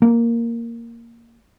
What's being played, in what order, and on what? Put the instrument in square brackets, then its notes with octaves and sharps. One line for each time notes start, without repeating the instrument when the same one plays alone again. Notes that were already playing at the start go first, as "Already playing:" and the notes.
[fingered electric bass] A#3